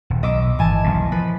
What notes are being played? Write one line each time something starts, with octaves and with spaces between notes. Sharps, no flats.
D#1
B1 D#5 D6 E6
G#1 E3 G#5 A5
E1 B1 A#2
F3 B4